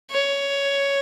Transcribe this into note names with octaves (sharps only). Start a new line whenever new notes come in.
C#5